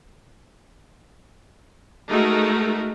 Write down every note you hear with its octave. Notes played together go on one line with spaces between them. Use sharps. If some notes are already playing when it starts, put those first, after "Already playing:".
G#3 A3 D#4 F#4 A#4